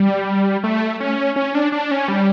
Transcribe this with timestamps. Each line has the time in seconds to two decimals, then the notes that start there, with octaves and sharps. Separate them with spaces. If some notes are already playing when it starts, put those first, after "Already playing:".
Already playing: G3
0.64 A3
1.00 C#4
1.36 C#4
1.55 D4
1.72 D4
1.91 C#4
2.08 G3